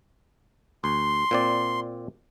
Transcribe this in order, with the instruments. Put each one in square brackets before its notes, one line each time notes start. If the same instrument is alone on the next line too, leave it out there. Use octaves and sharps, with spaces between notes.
[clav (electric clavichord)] D2 [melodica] C6
[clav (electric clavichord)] A#2 C4 D5